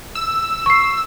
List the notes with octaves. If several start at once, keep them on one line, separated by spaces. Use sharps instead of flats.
E6
C#6 C7